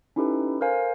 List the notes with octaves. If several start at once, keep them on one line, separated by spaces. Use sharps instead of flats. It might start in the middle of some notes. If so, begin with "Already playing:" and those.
C#4 D#4 E4 G4 A4 B4
A4 A#4 C5 F5 G#5